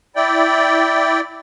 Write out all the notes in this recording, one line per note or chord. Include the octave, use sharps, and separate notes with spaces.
E4 D5 G5